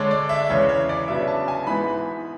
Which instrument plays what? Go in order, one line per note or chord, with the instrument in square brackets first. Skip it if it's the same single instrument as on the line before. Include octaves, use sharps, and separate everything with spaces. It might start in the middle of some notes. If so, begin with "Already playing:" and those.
Already playing: [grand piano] D3 G#3 D4 C#5
D5
E5
E2 C#3 G#3 C#4 C#5
C#5
D5
C#3 F#3 B3 D4 E5
A5
G#5
G#2 E3 B3 B5